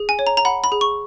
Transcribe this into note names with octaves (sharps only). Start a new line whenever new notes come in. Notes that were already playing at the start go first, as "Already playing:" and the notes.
Already playing: G#4
G#5
C#5
A#5
A#5
F#5 B5
B5
G#4
C#6